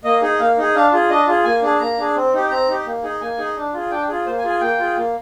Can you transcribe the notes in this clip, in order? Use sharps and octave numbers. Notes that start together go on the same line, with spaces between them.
A#3 D#5
D#4 G#4
A#3 F5
D#4 G#4
D4 F5
F4 G#4
D4 D#5
F4 G#4
A#3 G#5
D4 G#4
A#3 A#5
D4 G#4
C4
D#4 G4
C4 A#5
D#4 G4
A#3
D#4 G#4
A#3 G#5
D#4 G#4
D4
F4 G#4
D4 G5
F4 G#4
A#3 C5
G#5
F4 G#4
G#5
A#3 G5
F4 G#4
A#3